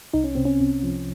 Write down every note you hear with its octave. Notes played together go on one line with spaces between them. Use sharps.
C2 D#4
C#4
C3 C4
C#4
C3
F3